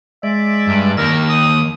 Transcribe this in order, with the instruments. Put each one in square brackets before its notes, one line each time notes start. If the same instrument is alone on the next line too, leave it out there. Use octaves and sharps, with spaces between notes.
[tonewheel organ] G#3 D5 [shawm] E5
[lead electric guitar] G2
[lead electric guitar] D#2 [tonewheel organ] D#3 E6 [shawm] A#4
[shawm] D#6